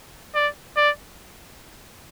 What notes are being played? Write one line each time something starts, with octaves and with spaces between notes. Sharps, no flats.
D5
D5